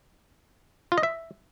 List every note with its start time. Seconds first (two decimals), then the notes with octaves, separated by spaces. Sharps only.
0.92 F4
0.98 D#5
1.03 E5